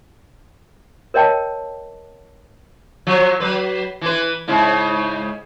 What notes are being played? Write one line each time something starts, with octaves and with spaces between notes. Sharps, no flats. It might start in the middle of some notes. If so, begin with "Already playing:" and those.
A#4 C#5 D#5 G5 A5
F3 F#3
F#3 B4
E3 B4
G#2 C#3 E4